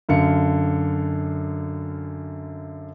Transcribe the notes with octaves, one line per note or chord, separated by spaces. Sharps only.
F#2 D3 F5 C#7